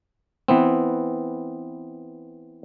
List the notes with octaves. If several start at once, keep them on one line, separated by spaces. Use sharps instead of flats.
E3 B3 C4